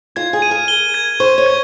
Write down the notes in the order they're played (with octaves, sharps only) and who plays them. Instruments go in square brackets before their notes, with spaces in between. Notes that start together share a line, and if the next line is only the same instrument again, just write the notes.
[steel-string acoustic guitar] F4 [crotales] G#6
[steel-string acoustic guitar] G#4
[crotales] D#7
[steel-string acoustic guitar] A#4
[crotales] G7
G#6
[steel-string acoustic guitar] C5 [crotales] C#6
[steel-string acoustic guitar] C#5
[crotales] G#6